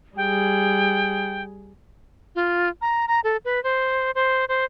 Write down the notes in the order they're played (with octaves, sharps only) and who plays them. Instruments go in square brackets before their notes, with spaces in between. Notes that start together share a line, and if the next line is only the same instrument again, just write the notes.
[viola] G3 G#4 [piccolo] G5
[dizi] F4
A#5
A#5
A4
B4
C5
C5
C5